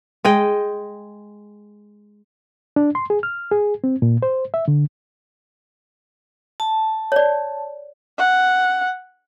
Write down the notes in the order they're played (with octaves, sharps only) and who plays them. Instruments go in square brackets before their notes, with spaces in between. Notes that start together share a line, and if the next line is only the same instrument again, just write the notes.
[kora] G#3 D#5 G5
[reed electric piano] D4
C6
G#4
F6
G#4
C4
A#2
C5
E5
D3
[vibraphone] A5
[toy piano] C#5 D5
[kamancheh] F#5